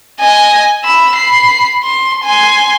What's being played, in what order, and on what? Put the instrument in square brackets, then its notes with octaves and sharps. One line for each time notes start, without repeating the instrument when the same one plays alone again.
[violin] D#5 G#5
B5 E6
B5 C7
C6
G#5 C6